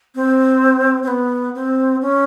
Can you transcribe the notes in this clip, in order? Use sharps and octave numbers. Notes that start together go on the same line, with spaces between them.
C4
C4
B3
C4
C#4